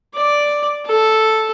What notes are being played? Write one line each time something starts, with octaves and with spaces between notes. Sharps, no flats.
D5
A4